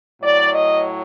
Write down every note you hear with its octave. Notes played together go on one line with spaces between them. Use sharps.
A2 F#3 D5
D#5